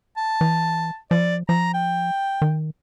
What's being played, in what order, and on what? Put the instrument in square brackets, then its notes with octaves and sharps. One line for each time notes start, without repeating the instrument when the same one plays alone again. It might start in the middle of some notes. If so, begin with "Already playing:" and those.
[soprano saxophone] A5
[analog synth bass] E3
[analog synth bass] F3 [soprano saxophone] D5
[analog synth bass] F3 [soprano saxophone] A#5
[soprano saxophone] G5
[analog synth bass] D#3